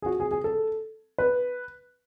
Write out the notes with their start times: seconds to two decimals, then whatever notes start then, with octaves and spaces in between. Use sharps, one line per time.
0.02 G#4
0.06 F#4
0.20 G#4
0.31 G#4
0.44 A4
1.18 B4